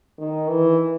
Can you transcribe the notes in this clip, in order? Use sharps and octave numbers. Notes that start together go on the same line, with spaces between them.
D#3
E3